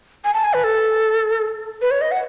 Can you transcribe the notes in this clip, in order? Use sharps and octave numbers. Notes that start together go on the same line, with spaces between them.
G#5
A5
G#5
B4
A4
B4
C#5
D#5
F#5